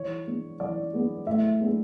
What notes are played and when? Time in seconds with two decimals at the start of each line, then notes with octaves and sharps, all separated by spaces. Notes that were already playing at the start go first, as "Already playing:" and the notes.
Already playing: E3 C#5
0.26 G#3 B3 D4
0.60 E3 D5
0.93 G#3 B3 D4
1.27 A2 E5
1.60 G#3 B3 D4